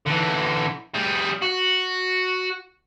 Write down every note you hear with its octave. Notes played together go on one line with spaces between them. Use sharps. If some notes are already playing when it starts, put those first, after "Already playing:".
D3 E3
G3 G#4
F#4